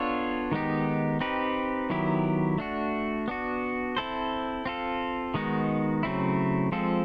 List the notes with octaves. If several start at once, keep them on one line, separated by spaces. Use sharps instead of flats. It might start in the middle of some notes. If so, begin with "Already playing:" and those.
Already playing: B3 D4 F4 A4 C#5
D#3 G#3 B3 D#4 G4
C4 D#4 G4 B4
D#3 F#3 B3 E4 G4
A3 D4 F#4
B3 D4 F#4
C4 E4 A4 C5
C4 F4 A4
D#3 G#3 B3 D#4 F#4
C#3 F#3 A3 C4 E4
F3 G#3 C4 F4 A4